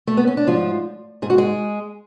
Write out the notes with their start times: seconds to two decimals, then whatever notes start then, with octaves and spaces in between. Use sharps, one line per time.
0.07 A3
0.17 B3
0.27 C#4
0.37 D4
0.47 G#2 F3 F4
1.22 G#2 G#4
1.30 F#4
1.38 G#3 G#4